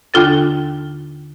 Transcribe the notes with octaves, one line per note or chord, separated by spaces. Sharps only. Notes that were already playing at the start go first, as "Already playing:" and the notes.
D#2 D3 D4 F4 A4 A6